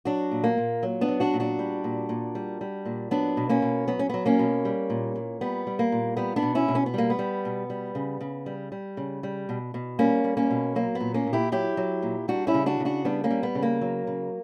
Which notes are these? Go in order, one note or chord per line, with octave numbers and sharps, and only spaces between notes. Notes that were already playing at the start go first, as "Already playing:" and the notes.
F#3 D4 F#4
A#2
A#3
A#2
F#3
B3 D4
F#3
D4 F#4
A#2
D4 F#4
G3
A#2
A#2
G3
G3
A#2
F#3 B3 D4
B2
A#3 C#4
B2
F#3 B3
C#4
F#3 B3
A#3 C#4
B2
G3
A#2
A#2
G3 B3
G3
A#3
A#2
G3 B3
B3 D4
B2
C#4 E4
B2
C#4
B3
G3 A#3
B3
G3
B2
G3
C#3
C#3
G3
G3
C#3
G3
B2
B2
G3 A#3 C#4
G3
A#3 C#4
B2
F#3 A#3
B3
A#2
A#3 C#4
A#2
E4 G4
F#3 E4 G4
F#3
A#2
G3 D4 F#4
C#4 E4
C#3
D4 F#4
C#3
D4 F#4
G3 B3 D4
A#3 C#4
G3
B3
C#3
A#3
F#3
C#3